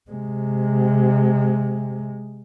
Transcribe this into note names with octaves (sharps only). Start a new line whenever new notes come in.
C3 G#3